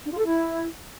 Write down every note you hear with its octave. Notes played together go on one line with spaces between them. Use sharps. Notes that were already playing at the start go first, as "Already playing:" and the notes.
D4
F4
A4
E4